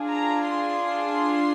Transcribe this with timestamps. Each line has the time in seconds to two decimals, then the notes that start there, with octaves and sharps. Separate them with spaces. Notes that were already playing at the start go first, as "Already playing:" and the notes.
Already playing: D4 F4 G#4
0.09 A#5
0.49 C6